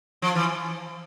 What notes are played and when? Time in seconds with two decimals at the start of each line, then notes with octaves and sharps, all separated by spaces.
0.22 F3
0.35 E3